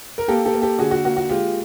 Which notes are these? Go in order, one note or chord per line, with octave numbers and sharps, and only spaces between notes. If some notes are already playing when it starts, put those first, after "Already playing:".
A#4
A#3 G4 A4
G4 A4
A#3
G4 A4
D3 F#4 G#4
F#4
A#3 F#4
F#4
G#3 F4 G4